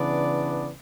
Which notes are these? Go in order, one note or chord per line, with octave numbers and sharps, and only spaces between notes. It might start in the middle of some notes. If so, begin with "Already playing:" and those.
Already playing: C#3 E3 B3 D4 D5